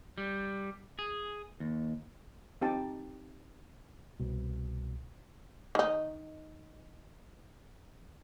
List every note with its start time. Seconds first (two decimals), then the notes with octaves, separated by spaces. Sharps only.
0.18 G3
0.99 G#4
1.60 D#2
2.61 C4 D#4 G4 G5 A5
4.20 C2 B2
5.75 D#3 D#4